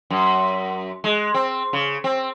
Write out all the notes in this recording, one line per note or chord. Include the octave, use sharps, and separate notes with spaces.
F#2
G#3
C4
C#3
C4